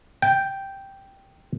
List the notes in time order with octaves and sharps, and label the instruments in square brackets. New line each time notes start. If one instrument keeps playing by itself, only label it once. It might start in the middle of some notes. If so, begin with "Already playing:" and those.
[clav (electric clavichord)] G5